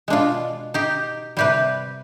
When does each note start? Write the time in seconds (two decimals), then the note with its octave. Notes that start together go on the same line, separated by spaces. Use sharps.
0.08 B2 G#3 D4 F4
0.74 D#4 G4
1.37 C3 G3 G4 B4